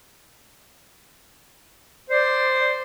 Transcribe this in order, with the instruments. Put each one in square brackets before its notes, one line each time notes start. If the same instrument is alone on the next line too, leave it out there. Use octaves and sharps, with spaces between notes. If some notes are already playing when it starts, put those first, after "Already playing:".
[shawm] C5 [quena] D5